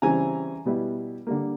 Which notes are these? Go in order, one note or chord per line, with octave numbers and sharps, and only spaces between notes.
C#3 E3 G3 C4 G#5 A#5
B2 G3 B3 E4
D3 G3 A#3